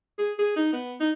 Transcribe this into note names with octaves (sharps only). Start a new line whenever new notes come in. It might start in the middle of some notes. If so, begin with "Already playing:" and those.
G#4
G#4
D#4
B3
D#4